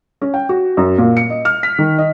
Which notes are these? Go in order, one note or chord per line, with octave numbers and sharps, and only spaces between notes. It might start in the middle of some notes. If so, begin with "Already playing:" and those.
C#4
G5
F#4
F#2
A#2
C#7
D#5
F6
B6
D#3
D#5